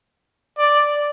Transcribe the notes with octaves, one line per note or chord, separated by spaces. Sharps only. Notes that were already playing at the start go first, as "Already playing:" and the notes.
D5